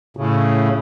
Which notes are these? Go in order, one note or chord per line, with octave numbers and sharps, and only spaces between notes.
A2 C#3